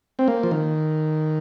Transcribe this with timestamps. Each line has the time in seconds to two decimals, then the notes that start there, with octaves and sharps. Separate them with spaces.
0.19 C4
0.28 A#3
0.43 F3
0.51 D#3